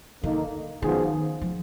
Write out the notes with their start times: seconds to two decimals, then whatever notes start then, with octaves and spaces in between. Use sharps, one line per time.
0.23 D3 D#3 A#3 D#4
0.82 F#2 D#3 F3 B3 F4 G#4
1.42 F3